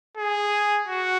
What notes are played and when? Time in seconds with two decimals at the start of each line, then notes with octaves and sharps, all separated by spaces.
0.17 G#4
0.88 F#4